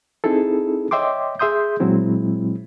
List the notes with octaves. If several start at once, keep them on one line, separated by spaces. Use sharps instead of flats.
C4 D#4 E4 G#4 A4
C#5 D#5 E5 G5 C6 D6
G#4 E5 C6 D#6 G6
A#2 F#3 G#3 C4 E4